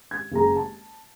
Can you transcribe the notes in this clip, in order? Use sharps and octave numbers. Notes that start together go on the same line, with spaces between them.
G#6
F#1 G#4 A#5
A5